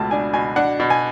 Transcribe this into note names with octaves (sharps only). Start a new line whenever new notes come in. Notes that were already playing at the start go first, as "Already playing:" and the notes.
Already playing: C#2 B2 A3 A5
D4 G#5
B2 G#5
D4 F#5
B2
G#5